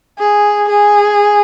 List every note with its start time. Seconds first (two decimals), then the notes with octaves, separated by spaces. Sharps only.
0.19 G#4
0.69 G#4